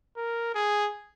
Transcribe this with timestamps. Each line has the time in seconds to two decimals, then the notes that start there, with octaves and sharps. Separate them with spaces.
0.16 A#4
0.54 G#4